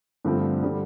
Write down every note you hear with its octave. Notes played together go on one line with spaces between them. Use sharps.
G2 D3 F3 A3 C4
D3 G3